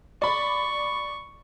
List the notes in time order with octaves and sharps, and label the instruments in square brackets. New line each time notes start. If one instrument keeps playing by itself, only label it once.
[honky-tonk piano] D5 B5 [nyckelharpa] C#6